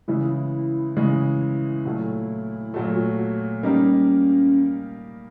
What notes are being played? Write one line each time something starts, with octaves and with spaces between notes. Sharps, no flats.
C#3 E3 G#3 E4
C#3 E3 G#3
A#2 F#3 A3
A#2 F#3 A3 F4
F#4
F#4
G3 A#3 C#4 D#4 G4 A#4